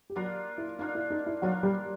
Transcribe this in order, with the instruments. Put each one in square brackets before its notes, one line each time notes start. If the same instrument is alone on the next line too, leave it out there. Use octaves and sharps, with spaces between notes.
[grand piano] G4
[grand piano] F#3 F#4 [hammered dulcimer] A#3 D4 F4 A#4
[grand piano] E4
[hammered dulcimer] A#3 D4 F4 A#4 [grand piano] D#4
[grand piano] E4
D#4
E4
[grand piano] F#3 F#4 [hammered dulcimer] A#3 D4 F4 A#4
[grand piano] G3 G4